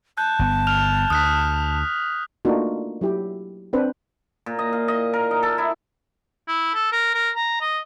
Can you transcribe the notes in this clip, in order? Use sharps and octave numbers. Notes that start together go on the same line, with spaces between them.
A5 F#6 G6
G1 B3
F6 F7
D2 D#6 F#6 B6
A3 A#3 D4 D#4 F4 F#4
F#3 E4 G4
C4 D4 B4 C5
A#2
D#5
F5
D#5
A#4
D#4
A4
E4
E4
A4
A#4
A#4
A#5
D#5